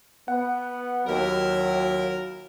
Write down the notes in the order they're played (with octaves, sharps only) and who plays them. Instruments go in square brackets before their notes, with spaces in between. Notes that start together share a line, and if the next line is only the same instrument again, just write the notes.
[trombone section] B3 [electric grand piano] F#5
[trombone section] D#2 [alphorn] F#3 [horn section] E4 F4 A#4